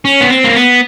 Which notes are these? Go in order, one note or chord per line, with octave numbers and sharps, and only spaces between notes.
C#4
B3
C4
A#3
B3